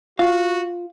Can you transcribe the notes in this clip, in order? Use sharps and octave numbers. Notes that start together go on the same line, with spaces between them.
F4 F#4 F5